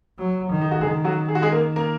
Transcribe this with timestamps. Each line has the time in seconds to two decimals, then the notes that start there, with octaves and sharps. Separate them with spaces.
0.18 F#3
0.50 D#3
0.61 D#4
0.71 F#4
0.81 D#3 G#3 G#4
1.04 F#3 F#4
1.29 G#4
1.35 F#4
1.42 G#3 G#4
1.52 A#3 A#4
1.76 A#3 A#4